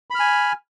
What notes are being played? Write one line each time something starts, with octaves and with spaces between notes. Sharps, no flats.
G#5 B5 F6